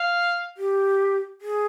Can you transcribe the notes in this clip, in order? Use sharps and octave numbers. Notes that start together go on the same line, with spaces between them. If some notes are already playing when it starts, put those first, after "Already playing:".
Already playing: F5
G4
G#4